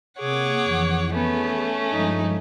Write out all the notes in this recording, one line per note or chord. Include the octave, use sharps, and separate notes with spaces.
C3 A#3 G#4 C#5 F#5 D6
F2 E3
A3 B3 C#4 G#4
G2 F3 G#3 D#4